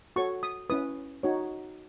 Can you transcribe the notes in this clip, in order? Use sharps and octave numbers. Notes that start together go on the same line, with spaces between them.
F#4 A4 C#5 C#6
D#6
C#4 E4 B4 D#6
D#4 F#4 C#5